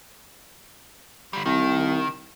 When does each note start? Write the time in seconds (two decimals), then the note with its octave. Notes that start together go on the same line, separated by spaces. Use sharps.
1.33 D3 G3
1.46 C2 D#3